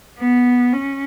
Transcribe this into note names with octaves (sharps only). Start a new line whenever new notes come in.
B3
C#4